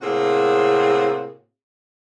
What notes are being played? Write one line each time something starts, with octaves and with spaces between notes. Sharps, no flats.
A2 C3 A#3 C4 F#4 G#4